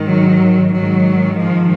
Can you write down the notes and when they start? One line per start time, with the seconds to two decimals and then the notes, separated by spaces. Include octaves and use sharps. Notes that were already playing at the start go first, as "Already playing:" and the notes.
Already playing: G#2 D#3
0.09 F#3
0.75 G#2 D#3 F#3
1.41 F3